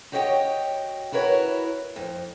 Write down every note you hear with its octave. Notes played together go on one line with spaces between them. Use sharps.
F#4 G4 C#5 D#5 E5 G5
E4 F#4 A#4 B4 C#5
F2